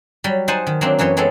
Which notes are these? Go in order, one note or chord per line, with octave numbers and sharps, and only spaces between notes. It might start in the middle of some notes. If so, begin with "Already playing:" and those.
F#3 G3
D#4 C5 F#5 G#5 A5
D#3
F#3 A#3 C4 D4
F#2 E3 D#4 C#5 C6
F#3 G#3 B3 C4 A4